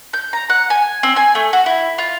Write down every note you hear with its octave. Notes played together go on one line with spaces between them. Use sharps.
G6
A#5
F#5
G#5
C4
G#5
A3
F#4
E4
F4